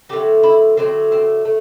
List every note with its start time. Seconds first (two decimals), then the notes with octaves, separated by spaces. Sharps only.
0.09 D3 F#3 A3 G4
0.43 E4
0.77 D3 F#3 A3 C4
1.12 C4
1.45 A3